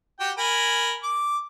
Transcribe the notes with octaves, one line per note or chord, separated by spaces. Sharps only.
F#4 G4 G5
A#4 G#5 B5
D6